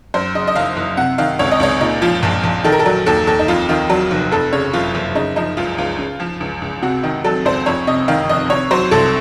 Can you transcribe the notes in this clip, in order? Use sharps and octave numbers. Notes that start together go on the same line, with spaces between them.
F#2 C5
C#3 D#5
D#5
F#1 F5
F#1
C3 F#5
D#3 F5
C#2 C#5
D#5
C#2 C#5
A#2 D#4
F3 F4
A#1
A#1
D#3 A4
A#4
A4
F#3
D#2 A4
D#2 A4
D#4
F2 F4
D#3 F4
F#3
F1
F2 A4
C#3 C#5
F#1 F4
F#1
C#3 D#4
F3 D#4
C#2 F4
C#2 F4
C#3
F3
C#2
C#2
C3 F#4
D#3
F#3 A4
C#2 C5
F2 C#5
C3 D#5
D#3 F5
F1 D#5
C3 C#5
F#3 C5
C2 A4